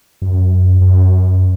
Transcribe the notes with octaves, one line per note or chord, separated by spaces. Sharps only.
F#2
F#2